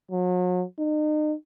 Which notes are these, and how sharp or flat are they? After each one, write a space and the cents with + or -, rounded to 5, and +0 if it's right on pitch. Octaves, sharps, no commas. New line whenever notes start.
F#3 -40
D#4 -35